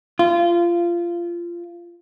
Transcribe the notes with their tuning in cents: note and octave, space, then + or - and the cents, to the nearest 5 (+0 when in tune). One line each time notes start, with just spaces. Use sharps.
F4 -20